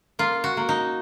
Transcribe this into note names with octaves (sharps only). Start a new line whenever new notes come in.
A#3 F4
F#4
A#3
D#4